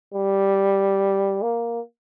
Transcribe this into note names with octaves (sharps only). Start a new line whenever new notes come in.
G3
A#3